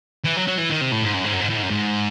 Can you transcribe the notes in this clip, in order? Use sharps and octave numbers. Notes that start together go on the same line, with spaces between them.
E3
F#3
F#3
E3
D#3
C3
A2
G#2
F#2
G#2
F#2
G#2
A2
G#2
F#2
G#2